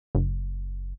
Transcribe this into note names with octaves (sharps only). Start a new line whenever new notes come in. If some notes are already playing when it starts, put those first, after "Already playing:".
F#1